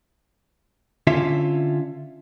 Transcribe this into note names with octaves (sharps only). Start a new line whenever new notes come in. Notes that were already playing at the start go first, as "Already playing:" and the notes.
D3 C#4 F4 E5